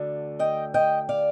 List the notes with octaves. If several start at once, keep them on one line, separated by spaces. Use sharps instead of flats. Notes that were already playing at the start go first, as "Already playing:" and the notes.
Already playing: D2 D3 A3
D#5 G5
D#5 G5
D5 F5